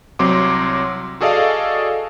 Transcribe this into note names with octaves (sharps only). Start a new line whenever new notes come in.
C2 F#3 C4 C6 D6
F#4 G#4 A4 D5 D#5 F5